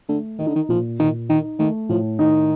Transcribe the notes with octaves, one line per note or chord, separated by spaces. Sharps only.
D3 A3
D#3 D#4
D3
D#3
A#2 F3
A#2 D#3
D#3 D#4
D#3 A3
A2 F3
D#3 D#4